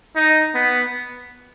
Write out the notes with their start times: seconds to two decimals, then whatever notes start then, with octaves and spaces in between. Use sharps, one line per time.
0.16 D#4
0.55 B3